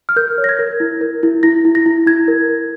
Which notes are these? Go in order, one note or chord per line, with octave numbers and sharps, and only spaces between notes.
F6
A#4 G6
C#5
A#6
G#6
A#4
E4
A#4
E4
E4 A#6
E4
A#6
E4
E4 G#6
A#4
A#4